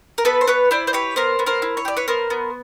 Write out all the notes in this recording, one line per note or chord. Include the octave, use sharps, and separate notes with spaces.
A#4
B3 A4 B4
C5
B3 B4 C#5
E4 C5 D5
C5
G4 B4 C#5
B3 A#4 C5
B3
A#4 C5
E4
C#5
G4 D5
B4 C#5
B3 A#4 C5
B3